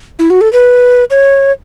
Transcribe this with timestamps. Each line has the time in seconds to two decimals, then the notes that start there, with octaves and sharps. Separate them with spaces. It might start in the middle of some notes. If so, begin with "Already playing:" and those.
0.19 E4
0.30 F#4
0.41 A4
0.53 B4
1.10 C#5